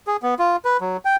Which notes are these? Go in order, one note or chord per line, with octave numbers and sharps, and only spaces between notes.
G#4
B3
F4
B4
F#3
G5